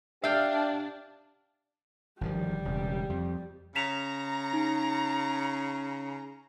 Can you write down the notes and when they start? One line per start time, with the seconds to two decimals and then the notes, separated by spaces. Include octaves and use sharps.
0.24 D4 G4 E5 F5 G5 F6
2.21 G1 D#3 F3 G3
2.65 E1 C#3
3.10 F2
3.76 C#3 A#5 B6 E7 F7
4.53 D#4